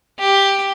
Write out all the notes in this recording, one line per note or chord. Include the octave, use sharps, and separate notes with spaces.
G4